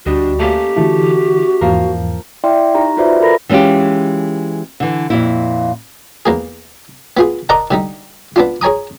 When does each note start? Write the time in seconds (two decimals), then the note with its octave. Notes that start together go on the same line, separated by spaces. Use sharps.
0.06 D2 G3 D4 F#4 D5 D#5
0.39 A3 A#3 C#4 G4
0.76 D3 E3 A3 E4 F#4
1.61 E2 G#2 E3 F3 A#3 A#4
2.44 E4 D5 E5 G5 C6
2.75 D#4 G4 A#5
2.97 F4 F#4 B4 C5 D5 E5
3.20 A4 A#4 A#5 B5 A#6
3.49 E3 G#3 C#4 F4 G4
4.80 D3 E3
5.10 F2 A#2 E4
6.26 E2 A#3 G#4
7.17 B3 F4 G#4
7.49 A#4 D5 D#5 F#5 A5 A#5
7.71 D3 G3 D#4
8.36 B3 D4 F4
8.61 G#4 C#5 G#5 A#5 D#6